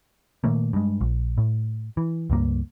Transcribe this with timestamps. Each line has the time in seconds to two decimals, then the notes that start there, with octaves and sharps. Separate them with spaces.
0.44 A#2 D#3 A3 A#3
0.73 G2 G#3
1.01 A#1
1.38 A2
1.97 E3
2.30 C#2 G2 A#3